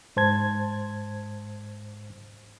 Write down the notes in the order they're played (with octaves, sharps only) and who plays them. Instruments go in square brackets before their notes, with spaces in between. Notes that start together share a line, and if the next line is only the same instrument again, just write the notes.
[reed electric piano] G#2 C5 A5 G#6